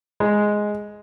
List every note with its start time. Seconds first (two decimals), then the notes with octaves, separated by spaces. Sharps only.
0.20 G#3